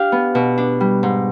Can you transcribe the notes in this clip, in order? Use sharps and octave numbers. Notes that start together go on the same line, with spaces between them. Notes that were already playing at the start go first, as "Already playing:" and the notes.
Already playing: D4 G4 F5
B3
B2
D4
G3
G#2